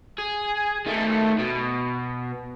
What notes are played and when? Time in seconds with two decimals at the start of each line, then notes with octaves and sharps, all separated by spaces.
0.18 G#4
0.86 D#3 A3
1.39 B2